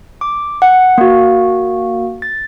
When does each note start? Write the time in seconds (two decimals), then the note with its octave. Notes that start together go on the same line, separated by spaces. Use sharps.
0.21 D6
0.62 F#5
0.98 A#3 F#4
2.22 A6